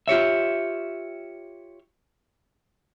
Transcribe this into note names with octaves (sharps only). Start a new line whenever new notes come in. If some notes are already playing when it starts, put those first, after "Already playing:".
F4 G4 C#5 E5